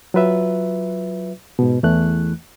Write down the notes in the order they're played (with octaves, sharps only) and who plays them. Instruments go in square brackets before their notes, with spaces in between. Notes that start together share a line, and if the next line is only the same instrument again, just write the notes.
[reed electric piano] F#3 F4 B4 E5
G#2 B2
E2 E3 A3 F#6